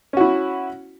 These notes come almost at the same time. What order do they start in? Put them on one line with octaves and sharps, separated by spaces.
C#4 F#4 E4